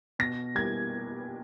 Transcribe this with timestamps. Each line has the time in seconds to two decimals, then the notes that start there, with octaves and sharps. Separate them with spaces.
0.19 B2 A#6
0.55 G3 A#3 E4 G#6